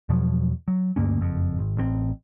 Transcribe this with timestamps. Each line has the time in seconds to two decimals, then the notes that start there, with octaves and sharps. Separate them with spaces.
0.09 E2 B2 F3 F#3
0.68 F#3
0.96 D2 G2 A#3 C#4
1.20 F#1 F2
1.59 G#1
1.77 A1 B2 C4